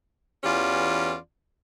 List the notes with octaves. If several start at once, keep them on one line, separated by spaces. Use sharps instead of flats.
E2 E3 C#4 F4 G4 D5